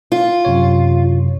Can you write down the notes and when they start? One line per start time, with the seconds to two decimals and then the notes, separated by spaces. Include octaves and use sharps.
0.12 F4
0.45 F#2 C3 C#5